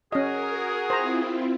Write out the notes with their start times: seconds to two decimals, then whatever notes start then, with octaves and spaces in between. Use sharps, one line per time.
0.12 C#4 F#4 G#4 A#4 D#5
0.90 C4 E4 F4 C5 A#5